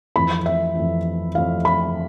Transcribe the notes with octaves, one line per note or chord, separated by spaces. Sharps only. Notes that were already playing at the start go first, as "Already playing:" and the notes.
F2 E3 B5
E5
F2 E3
F2 E3 F5
B5